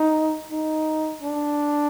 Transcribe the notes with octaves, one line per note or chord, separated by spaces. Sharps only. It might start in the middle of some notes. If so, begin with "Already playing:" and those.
Already playing: D#4
D#4
D4